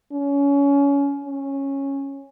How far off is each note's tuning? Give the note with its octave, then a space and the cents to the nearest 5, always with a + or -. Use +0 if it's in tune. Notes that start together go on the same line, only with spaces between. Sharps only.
C#4 +25
C#4 -10